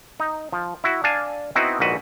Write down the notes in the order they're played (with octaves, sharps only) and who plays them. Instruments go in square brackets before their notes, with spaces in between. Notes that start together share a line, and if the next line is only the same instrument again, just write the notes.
[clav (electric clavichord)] D#4
F3
E4 F#4
D4 F5 G#5 A5
B3 C4 D#4 E4 F#4
A#1 G#2 F#4 B4